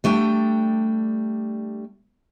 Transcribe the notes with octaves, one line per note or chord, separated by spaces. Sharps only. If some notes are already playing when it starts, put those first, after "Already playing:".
G3 A3 D4 G5